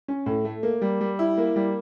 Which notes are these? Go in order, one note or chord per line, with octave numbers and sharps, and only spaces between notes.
C#4
A2
A3
A#3
G3
G3
E4
A#3
G3